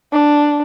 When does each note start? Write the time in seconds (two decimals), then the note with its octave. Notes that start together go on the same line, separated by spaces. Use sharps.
0.12 D4